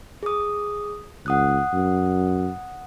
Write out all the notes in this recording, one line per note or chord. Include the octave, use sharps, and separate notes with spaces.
G#4 D#6
C#2 F#5 D#6 F#6
F#2